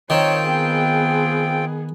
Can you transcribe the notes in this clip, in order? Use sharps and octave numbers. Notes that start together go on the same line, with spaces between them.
D#3 C4 F4 C#5 G5
B3 G#4